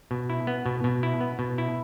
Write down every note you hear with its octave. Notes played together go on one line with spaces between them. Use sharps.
B2
E4
B3
B2
B2
E4
B3
B2
E4